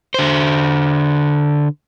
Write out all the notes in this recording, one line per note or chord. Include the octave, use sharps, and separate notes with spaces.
D3 C5